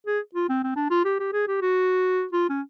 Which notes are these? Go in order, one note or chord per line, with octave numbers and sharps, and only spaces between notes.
G#4
F4
C4
C4
D4
F4
G4
G4
G#4
G4
F#4
F4
C#4